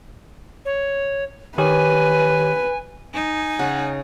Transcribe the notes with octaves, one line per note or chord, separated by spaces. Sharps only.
C#5
D#3 G4 B4 C#5 G#5
D#4 G#5
C#3 F#5